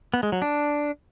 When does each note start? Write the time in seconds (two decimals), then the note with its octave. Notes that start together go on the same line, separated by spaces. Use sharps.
0.14 B3
0.23 G#3
0.32 F#3
0.42 D4